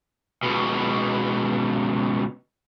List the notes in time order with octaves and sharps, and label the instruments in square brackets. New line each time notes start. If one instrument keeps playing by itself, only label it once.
[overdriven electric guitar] C#2 B2